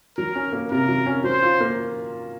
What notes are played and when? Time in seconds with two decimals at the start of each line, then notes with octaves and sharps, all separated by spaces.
0.17 F#3 A#4
0.35 C#4
0.53 A#3
0.70 C3 A#4
0.89 F#3
1.06 C#4
1.24 F#3 C5
1.43 F4
1.60 A#3